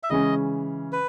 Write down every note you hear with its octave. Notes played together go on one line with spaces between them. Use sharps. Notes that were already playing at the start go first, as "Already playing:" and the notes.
E5
C#3 E3 G#3 C#4 D#5
B4